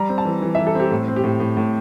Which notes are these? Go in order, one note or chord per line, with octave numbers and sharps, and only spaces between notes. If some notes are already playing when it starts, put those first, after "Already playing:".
Already playing: G3 A#5
C4
A5
E3
E3
E3 E5
A4
C4 G4
A2
C4
G4
A2
A2
A2